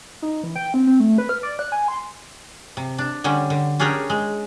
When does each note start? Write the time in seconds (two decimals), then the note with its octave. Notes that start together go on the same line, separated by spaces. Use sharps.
0.22 D#4
0.43 E3
0.56 G5
0.74 C4
0.87 C4
1.00 A3
1.18 B4
1.29 F6
1.43 D5
1.59 F#6
1.72 G#5
1.88 C6
2.77 C3
2.98 D4
3.24 D3 G3 C#4
3.50 D3
3.80 C#4 D4 G4 G#4 A#4 C#5
4.10 G#3